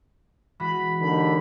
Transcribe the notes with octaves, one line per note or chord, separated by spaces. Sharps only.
E3 G#3 F#4 B5
D#2 D3 D#3 B5